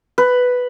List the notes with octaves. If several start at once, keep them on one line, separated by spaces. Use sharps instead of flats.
B4